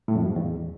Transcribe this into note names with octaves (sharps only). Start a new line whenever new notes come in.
A2
F2
F#2
G#2
E2